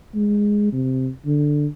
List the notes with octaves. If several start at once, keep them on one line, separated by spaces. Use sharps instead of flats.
G#3
C3
D3